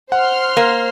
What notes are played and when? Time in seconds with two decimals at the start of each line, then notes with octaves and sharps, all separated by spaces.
0.12 C5 F#5 C6 F6
0.57 A#3